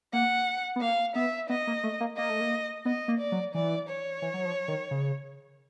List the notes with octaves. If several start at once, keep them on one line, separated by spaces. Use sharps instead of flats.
A#3 F#5
B3
A#3 F5
B3 E5
B3 D#5
A#3
A3
A#3
A#3 D#5
A3
A#3
B3 D#5
A#3
D5
F#3
E3 D5
C#5
E3
F#3
F3
D#3
C#3